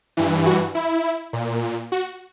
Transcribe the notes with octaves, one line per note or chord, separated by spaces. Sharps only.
G2 E3
F#4
E4
A#2
F#4